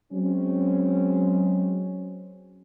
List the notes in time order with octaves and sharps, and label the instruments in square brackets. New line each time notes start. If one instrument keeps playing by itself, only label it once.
[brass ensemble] F#3 G#3 C4 C#4